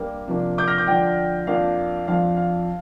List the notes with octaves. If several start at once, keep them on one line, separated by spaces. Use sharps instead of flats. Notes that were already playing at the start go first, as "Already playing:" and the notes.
Already playing: G3 A#3 D4
C3 F3 A#3 D4
D6 G6
F6 A#6
D6 G6
D3 F3 D4 D5 G5
F2 F3 A#3 D4 F5
F2 F3 D4 F5
F5